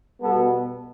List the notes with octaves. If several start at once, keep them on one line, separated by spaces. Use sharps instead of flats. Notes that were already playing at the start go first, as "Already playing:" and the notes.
B2 G3 B3 A4